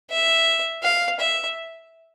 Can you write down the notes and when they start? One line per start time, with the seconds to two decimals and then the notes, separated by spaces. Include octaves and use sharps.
0.11 E5
0.83 F5
1.20 E5